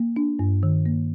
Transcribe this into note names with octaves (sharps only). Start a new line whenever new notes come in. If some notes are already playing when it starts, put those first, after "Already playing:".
Already playing: A#3
D4
G2
D#3
A#3